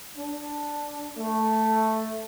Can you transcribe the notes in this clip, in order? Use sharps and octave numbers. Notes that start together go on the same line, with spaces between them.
D4
A3